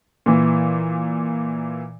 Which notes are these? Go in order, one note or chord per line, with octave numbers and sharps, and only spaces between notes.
A#2 E3